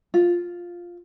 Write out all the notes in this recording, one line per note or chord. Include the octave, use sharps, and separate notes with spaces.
F4